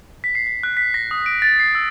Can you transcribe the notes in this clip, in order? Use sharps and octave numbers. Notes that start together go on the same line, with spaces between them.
B6
C7
B6
F#6
B6
A#6
D#6
D7
A6
C7
E6